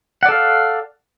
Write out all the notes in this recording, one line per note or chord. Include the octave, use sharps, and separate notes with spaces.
A4 D5 F5 F#5